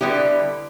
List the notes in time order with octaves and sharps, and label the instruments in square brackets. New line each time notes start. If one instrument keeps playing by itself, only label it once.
[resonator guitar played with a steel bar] D3 G3 B3 E4 G4